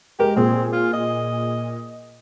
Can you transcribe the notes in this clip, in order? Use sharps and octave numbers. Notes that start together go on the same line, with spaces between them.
G#3 G4 A#4
A#2 C4 G#4
F4
D#5